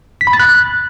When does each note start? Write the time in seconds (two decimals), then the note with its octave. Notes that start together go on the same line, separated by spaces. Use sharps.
0.21 B6
0.27 B5
0.33 A6
0.40 F#6